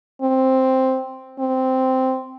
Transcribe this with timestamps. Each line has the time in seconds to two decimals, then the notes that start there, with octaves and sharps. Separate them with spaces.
0.22 C4
1.39 C4